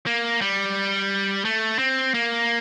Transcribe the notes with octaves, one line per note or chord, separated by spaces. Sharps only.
A#3
G3
A3
C4
A#3